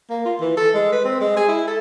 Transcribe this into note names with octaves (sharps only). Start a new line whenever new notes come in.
A#3
F4
E3
A4
G#3
B4
C4
G#3
G#4
E4
A4